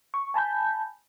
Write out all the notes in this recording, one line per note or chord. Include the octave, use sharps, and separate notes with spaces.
C#6
G#5 A5 B5 G6